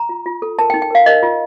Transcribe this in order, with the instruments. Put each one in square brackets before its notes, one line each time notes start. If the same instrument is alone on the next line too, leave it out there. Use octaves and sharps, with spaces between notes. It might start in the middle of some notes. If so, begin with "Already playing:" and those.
Already playing: [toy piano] A#5
F4
F4
A4
A#4 A5
G5
D#4
G5
A#4 F5
A#4 D#5
F4